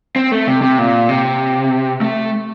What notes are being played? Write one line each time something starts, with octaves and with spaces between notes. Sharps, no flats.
C4
A3
C3
C3
A#2
C3
A3